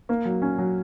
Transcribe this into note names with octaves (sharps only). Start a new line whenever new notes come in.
A#3
F#3
C#4
F#3